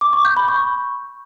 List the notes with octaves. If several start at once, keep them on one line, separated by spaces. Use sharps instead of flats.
D6
C#6
G6
B5
C#6